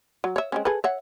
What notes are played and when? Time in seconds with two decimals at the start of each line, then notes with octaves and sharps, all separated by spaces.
0.24 F#3
0.36 C#5 E5
0.52 G#3 C4 C#4
0.65 G#4 A4 B4
0.84 C#5 E5 F#5